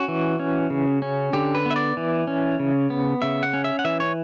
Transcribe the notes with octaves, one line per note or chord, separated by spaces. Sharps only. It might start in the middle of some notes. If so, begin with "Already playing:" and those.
Already playing: C#4 F#4
E3
C#4
C#3
C#4
D3 G4
B4
B3 E5
D5
E3
C#4
C#3
B3
C#3 E5
F#5
C#4
E5
F#5
E3 E5
C#5